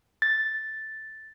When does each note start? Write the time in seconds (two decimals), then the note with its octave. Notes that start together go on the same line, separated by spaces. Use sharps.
0.22 A6